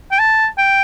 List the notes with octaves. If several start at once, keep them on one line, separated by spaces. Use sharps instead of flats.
G5
A5
G5